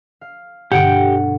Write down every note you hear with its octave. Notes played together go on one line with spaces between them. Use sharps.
F5
G2 B2 D3 G4 F#5 G5